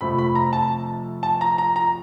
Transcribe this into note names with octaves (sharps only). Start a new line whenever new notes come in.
F2 C3 F3 A3 B5
B5
A#5
A5
A5
A#5
A#5
A#5